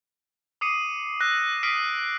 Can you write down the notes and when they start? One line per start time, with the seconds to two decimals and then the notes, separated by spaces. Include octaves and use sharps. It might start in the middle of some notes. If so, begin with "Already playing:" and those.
0.61 D6 D#6 C7 C#7 D#7 F#7
1.21 E6 F#6 A#6
1.63 D#6 F6 B6 C7 D7 D#7